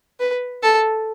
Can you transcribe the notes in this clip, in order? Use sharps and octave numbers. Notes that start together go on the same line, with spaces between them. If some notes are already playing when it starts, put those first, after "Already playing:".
B4
A4